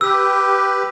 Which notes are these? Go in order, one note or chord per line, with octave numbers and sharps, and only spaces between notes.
G4 B4 E6